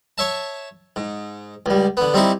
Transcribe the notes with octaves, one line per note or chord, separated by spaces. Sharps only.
C#5 E5 A5
G#2
C#2 G3
D3 B3
G3 C4 D#4 E4 G4